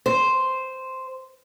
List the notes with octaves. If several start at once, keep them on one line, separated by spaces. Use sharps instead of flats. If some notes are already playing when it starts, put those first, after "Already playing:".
C5